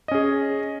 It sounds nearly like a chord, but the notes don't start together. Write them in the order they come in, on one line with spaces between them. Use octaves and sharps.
D#5 C#4 G#4